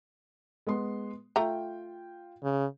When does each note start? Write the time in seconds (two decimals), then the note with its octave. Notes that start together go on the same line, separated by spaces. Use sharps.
0.67 G#3 B3 C6
1.36 A3 F4 G5 A#5
2.43 C#3